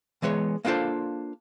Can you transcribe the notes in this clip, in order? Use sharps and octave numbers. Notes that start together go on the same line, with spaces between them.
E3 G#3 B3 C#5
A#3 B3 D4 F4 A4 C5